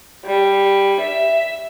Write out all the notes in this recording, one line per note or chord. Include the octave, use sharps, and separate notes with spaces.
G3
E5